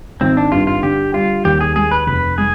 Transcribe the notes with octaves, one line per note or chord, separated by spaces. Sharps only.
G#1 C4
D4
G2 F4
F4
D3 G4
G3 F4
D#2 G4
G#4
G#3 G#4
B4
F1 B4
G#3 G#4